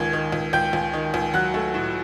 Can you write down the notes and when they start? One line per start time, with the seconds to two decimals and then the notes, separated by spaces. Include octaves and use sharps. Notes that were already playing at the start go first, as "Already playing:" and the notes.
Already playing: C#2 D#3 G#6
0.13 D#3
0.32 C#2
0.53 C#2 G5 G6
0.73 C#2
0.93 D#3
1.14 C#2
1.34 F#3 F#5 F#6
1.54 A3
1.74 A2